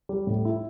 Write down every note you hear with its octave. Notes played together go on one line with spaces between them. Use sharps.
G3
A2
E4